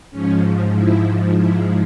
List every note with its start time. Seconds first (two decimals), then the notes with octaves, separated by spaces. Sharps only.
0.11 G#2 F3 C#4
0.76 E4
1.38 E4